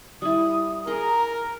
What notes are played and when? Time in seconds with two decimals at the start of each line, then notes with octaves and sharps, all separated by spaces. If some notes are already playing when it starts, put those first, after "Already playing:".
0.22 G3 E4 D#6
0.87 G#4 A#4 A#5 C6